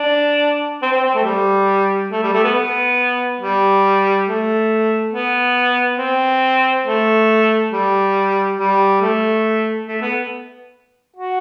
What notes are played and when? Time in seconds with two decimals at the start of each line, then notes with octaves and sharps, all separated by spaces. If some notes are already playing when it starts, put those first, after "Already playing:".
Already playing: D4
0.82 C4
0.92 C4
1.04 C4
1.15 A3
1.24 G3
2.12 A3
2.23 G3
2.33 A3
2.44 B3
2.54 B3
3.40 G3
4.27 A3
5.12 B3
5.99 C4
6.85 A3
7.72 G3
8.58 G3
9.01 A3
9.87 A3
10.01 B3
11.16 F#4